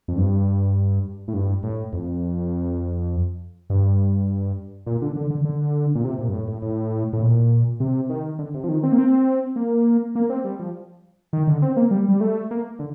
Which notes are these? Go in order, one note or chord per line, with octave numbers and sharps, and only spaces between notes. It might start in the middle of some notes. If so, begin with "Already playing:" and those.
F2
G2
A2
G2
A2
F2
G2
A#2
D3
D3
D3
D3
A#2
C3
A#2
G2
A2
A2
A2
A2
A#2
C3
D#3
D3
C3
F3
D#3
C4
A#3
C4
A#3
A#3
C4
G3
F3
D#3
D3
C4
A#3
G3
G3
A3
A#3
D3